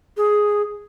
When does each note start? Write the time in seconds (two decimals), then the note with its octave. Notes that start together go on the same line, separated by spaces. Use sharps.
0.17 G#4